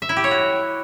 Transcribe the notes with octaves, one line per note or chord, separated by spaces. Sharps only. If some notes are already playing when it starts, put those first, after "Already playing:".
E5
E4
G4
C#5
F#4